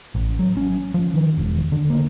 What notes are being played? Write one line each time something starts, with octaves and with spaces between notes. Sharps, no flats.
A1
F#3
C#4
F3
D#3
E1
D3
A#3